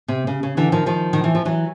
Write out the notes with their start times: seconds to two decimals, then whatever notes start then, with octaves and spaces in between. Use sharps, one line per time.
0.08 C3
0.27 C#3
0.43 C#3
0.57 D3 E3
0.72 D#3 F3
0.86 D#3 F3
1.13 D#3
1.24 E3
1.35 F3
1.45 E3 F#3